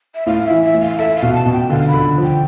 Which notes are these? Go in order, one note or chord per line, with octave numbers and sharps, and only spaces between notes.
E5
A2 F5
E5
E3
E5
A2
F5
A4 E5
F5
B2
A5
B2
G5
D3 F5
B5
D3
F3
G5